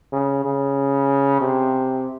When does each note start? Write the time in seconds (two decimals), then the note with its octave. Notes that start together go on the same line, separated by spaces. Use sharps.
0.12 C#3
0.45 C#3
1.41 C3